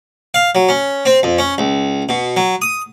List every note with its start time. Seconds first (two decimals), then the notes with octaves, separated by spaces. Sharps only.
0.34 F5
0.55 F#3
0.69 C#4
1.06 C4
1.23 F2
1.38 C#4
1.58 C#2
2.09 B2
2.37 F#3
2.62 D#6